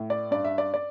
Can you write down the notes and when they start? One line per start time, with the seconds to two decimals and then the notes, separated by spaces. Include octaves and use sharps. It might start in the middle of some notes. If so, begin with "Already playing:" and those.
Already playing: A2
0.10 D5
0.31 G2 D5
0.45 E5
0.58 D5
0.74 D5